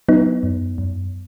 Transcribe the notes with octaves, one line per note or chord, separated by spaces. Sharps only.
F#3 B3 D#4
F#2
F#2